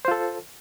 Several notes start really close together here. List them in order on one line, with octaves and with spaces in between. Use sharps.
C5 F4 A4